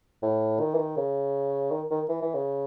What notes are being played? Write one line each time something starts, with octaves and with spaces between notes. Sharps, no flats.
A2
D#3
E3
D#3
C#3
D#3
D#3
E3
E3
C#3